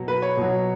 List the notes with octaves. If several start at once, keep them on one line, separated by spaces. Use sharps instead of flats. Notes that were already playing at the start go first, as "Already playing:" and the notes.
Already playing: B2 F#3
B4
C#5
B2 F#3